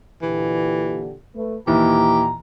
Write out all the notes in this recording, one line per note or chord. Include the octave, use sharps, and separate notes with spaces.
A#2 D3 E3 G4
A3 B4
D#2 A#2 E3 G4 A#5